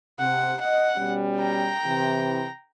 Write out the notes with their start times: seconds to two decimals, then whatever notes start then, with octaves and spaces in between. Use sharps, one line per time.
0.19 C3 F#5
0.61 D#5 F#5
0.97 B2 G3 C#4
1.38 G5 A#5
1.85 C3 E3